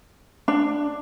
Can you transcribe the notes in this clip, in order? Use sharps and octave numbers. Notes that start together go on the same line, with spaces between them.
D4